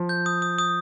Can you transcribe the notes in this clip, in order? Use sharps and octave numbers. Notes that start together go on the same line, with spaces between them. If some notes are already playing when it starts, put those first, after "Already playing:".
Already playing: F3
G6
D#6
D#6
D#6